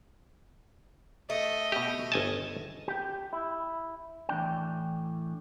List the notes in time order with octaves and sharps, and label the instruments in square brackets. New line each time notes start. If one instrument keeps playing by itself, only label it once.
[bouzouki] A3 [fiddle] D#5
[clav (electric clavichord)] B2 G4
G1 G#5 A5
[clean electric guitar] G4 G5
E4
A2 E3 D4 G5